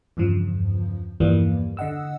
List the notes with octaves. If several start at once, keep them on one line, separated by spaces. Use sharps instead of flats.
E2 G2 C#3 F3
E2 G2 E3 F3 G3 A#3
D3 D#5 F#5 E6